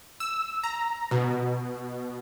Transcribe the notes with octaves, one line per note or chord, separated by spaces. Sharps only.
E6
A#5
B2